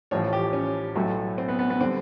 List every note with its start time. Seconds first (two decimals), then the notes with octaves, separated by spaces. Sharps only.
0.11 A1 A2 F3 C#5
0.33 G4
0.53 C#4
0.95 B1 A2 F#3 A3
1.38 C4
1.48 B3
1.59 B3
1.70 B3
1.80 D3 G3 C4